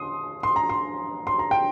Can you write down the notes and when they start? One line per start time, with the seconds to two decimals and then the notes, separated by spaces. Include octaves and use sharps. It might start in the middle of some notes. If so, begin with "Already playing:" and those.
Already playing: C6 D#6
0.43 C6
0.56 A#5
0.69 C6
1.27 C6
1.39 A#5
1.51 G5